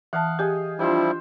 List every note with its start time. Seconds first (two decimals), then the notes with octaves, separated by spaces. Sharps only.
0.13 E3 F5 F#5 A5 D#6
0.39 G4 G#4 D#5 G5
0.79 F3 G3 D4 E4 F4 C5 G5